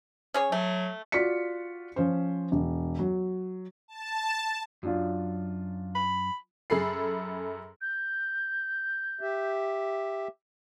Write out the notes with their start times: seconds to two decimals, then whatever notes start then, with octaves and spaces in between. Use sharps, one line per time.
0.34 C#4 G#4 C#5
0.52 F#3 A3
1.12 F4 F#4 D5 B6 C#7
1.96 F3 C#4 C5
2.52 E1
2.99 F#3
3.88 A5
4.83 F#2 F#3 D4 F4
5.95 B5
6.70 F#2 G#4 A4 B5 C7
7.81 G6
9.21 G4 E5